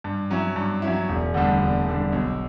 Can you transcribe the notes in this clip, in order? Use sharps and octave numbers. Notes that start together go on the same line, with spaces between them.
G2
F#3 C#4 E4
G2
F#3 C#4 E4
E1
D2 D3 G3 D4
E1
D2 D3 G3 D4
B1